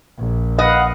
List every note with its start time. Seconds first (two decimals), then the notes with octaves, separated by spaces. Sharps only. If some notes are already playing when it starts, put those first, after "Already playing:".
0.18 A#1
0.59 B4 D#5 F5 F#5